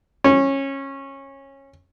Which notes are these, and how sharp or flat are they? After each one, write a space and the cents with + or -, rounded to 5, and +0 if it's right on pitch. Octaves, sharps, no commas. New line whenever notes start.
C#4 -20